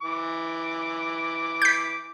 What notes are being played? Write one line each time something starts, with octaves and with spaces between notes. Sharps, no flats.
E3 D6
G6 B6